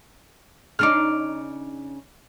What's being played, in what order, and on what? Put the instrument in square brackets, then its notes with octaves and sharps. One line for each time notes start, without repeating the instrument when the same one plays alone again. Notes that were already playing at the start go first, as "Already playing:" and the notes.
[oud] C#3 D4 D#4 [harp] D6 F6